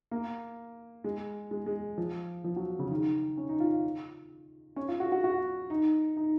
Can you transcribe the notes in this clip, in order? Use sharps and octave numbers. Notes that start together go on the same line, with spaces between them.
A#3
G#3
G#3
G#3
F3
F3
F#3
C#3
D#3
C#4
D#4
F4
C#4
F4
F#4
F#4
F#4
D#4
D#4